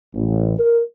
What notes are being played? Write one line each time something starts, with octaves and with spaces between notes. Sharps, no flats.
A1
A#4